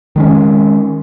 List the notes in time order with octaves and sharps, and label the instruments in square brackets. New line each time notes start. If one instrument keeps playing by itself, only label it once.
[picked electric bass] D#3 G#3 C#4